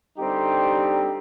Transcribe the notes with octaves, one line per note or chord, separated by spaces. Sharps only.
D3 G3 C4 D#4 G4